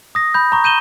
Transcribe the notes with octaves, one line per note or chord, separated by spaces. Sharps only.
D#6 A#6
B5 G6
A#5 C#6
G6 D#7 E7 G7